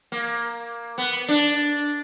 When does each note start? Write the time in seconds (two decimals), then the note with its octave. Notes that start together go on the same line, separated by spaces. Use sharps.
0.12 A#3
0.98 B3
1.28 D4